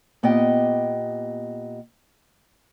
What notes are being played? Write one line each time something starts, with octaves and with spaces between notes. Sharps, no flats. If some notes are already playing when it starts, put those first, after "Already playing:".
A#2 B3 G4 D#5 G5